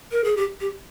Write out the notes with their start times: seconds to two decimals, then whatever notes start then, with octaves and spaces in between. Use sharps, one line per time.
0.12 A#4
0.24 G#4
0.37 G4
0.60 G4